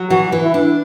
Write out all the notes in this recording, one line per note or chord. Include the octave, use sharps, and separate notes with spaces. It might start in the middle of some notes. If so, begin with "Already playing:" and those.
Already playing: F#3
E3 F#4
E3
E4
D4